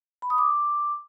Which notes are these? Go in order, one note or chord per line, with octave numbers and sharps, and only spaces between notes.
B5
D#6
D6